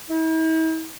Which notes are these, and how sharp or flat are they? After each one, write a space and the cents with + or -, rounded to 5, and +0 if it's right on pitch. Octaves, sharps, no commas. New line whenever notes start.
E4 -45